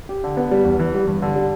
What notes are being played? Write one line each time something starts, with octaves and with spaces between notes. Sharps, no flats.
G4
D3
B3
G3
E2
E3
G3
G2
D3
G3